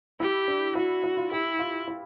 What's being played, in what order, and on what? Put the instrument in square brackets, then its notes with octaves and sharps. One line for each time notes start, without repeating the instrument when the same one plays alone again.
[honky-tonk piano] E4 [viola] G4
[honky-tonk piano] D4
[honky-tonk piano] E4 [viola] F#4
[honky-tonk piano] E4
F4
[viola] E4 [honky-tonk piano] G4
[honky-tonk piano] F4
E4